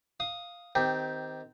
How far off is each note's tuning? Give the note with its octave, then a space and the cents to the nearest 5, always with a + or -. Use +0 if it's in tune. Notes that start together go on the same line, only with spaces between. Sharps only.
F5 +0 D#6 +0
D#3 +10 C4 -20 G4 +0